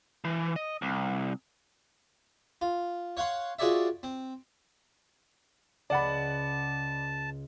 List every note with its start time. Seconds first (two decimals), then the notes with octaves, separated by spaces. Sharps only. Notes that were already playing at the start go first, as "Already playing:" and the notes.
0.24 E3
0.56 D#5
0.82 C2
2.61 F4
3.17 C#5 F5 F#5 C6
3.59 F4 F#4 G#4 C#5 D5 E5
4.03 C4
5.90 C#2 D5 F#5 A5 B5